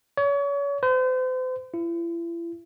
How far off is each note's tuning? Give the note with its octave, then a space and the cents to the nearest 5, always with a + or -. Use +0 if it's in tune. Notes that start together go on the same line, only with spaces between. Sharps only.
C#5 +35
C5 -40
E4 +40